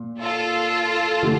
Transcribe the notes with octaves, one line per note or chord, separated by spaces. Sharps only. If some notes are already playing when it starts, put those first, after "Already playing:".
Already playing: A#2
F4 A4
D3 A3 E4 G4